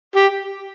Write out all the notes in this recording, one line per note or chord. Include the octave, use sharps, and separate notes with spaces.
G4